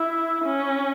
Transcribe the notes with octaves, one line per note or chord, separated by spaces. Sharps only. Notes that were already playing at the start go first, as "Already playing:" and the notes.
Already playing: E4
C#4